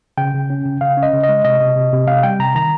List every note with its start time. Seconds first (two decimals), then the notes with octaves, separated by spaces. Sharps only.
0.18 C#3 G5
0.34 C#3
0.50 C#4
0.66 C#3
0.81 C#3 F5
0.97 C#4
1.03 D#5
1.13 C#3
1.24 D#5
1.29 G#3
1.45 C3 D#5
1.61 C3
1.76 C3
1.93 C3
2.07 C3 F5
2.23 G3 G5
2.40 C3 A#5
2.55 D#3 A#5